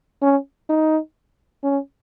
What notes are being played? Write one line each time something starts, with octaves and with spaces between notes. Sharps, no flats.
C#4
D#4
C#4